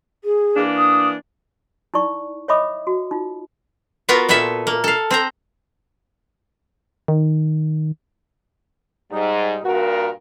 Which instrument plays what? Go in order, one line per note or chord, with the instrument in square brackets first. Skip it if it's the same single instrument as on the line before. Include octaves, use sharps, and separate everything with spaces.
[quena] G#4
[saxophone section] E3 A#3 D4
[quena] D#6
[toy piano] D#4 E4 D5 C#6
C#5 D#5 E5 B5 D6 D#6
F#4
D#4 F4
[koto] B3 F4 F#4 A#4 B4
A#2 B3 A4 B4 E5
A#3
A4 F5
C4 C5 A#5
[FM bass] D#3
[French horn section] G#2 [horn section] G3 D#4
[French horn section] G2 A#2 A#4 [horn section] F#4